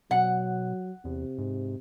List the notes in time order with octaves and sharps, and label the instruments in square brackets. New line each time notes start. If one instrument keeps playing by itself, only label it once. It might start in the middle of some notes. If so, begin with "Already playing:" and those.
[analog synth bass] B2 [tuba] F#3 [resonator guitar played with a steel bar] F#5
[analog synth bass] E2 [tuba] C3
[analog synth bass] G#2